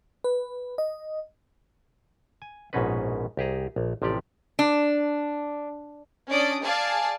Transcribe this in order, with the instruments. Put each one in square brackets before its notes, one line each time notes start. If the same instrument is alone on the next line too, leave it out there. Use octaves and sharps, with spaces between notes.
[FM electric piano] B4
D#5
[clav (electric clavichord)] G#5
A#1 G#2 B2 C#4 D#4 B4
C2 G4 G#4 A#5
A#1
A1 C3 F3 G4 D5
[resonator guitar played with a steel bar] D4
[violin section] C#4 D4 D5 D#6 D7
G#4 D5 F5 G#5 A5